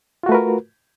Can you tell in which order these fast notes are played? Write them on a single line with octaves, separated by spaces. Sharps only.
F4 F#4 A3 B4 A#4